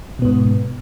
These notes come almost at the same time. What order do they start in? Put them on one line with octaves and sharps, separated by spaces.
B2 B3 G#2